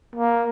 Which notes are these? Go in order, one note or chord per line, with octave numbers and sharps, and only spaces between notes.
A#3